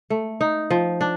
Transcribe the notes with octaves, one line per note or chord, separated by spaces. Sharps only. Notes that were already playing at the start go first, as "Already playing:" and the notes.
A3
D#4
F3
D4